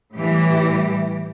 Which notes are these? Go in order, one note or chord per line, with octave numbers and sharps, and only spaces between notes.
A2 E3 G3 G4